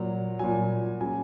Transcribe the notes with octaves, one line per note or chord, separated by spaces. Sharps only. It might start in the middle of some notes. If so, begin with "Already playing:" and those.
Already playing: A#2 F#3
A#2 F#3 G#5
C#3 F#3 G#5